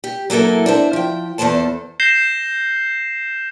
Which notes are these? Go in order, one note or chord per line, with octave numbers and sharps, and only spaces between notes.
G4
F#3 A#3 E4 A4 A#4
D4 C5 E5
F3 G5
E2 G2 A4 C5 A5
G6 A#6 C7 E7 G7